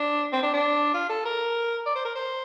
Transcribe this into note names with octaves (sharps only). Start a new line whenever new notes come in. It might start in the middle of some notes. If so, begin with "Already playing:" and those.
Already playing: D4
C4
D4
D4
F4
A4
A#4
D5
C5
A#4
C5